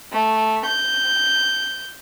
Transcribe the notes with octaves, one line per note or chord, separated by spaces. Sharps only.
A3
G6